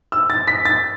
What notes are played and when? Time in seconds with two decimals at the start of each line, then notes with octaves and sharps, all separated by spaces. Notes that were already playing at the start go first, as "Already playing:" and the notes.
0.12 E6
0.30 A6
0.47 B6
0.65 A6